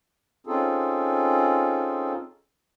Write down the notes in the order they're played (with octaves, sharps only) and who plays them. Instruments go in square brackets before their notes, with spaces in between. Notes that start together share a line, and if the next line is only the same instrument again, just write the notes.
[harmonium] C4 C#4 D#4 F4 G#4 A4